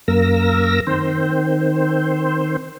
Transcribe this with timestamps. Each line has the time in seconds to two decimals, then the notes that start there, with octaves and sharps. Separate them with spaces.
0.08 F#2 A#3 A#4 E6 A#6
0.87 D#3 C4 C5